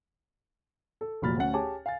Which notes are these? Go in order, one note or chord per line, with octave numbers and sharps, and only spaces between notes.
A4
F1 A#2 F#3 B5 F6 A6
D2 C#4 F#5
G4 G#4 C#5 G#5 A5 D6
F5 G#5 A6